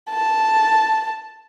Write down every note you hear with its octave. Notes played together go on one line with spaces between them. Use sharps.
A5